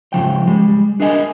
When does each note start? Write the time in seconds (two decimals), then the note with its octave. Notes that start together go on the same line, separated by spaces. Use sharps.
0.13 G#2 C#3 F3 G5
0.47 G3 G#3
1.00 D4 G#4 A#4 D#5 F5 G#5